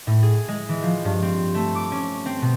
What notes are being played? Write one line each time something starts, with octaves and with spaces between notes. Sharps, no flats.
A2
G#4
G#3
E3
F3
G2
C4
A3
D6
C#4
C4
B2